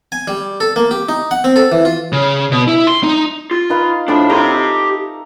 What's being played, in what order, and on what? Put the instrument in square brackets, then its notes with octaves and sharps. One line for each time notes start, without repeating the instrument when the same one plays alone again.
[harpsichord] G#5
G3
A4
A#3
G4
D#4
F#5
C4
A4
E3
F4
[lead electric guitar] C#3
B2
E4
C6
D#4
F4
[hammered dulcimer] D#4 B4 F5
[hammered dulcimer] A2 F3 B5 [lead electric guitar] D4
[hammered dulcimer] D#4 A4 A#5 [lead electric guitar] G4 C6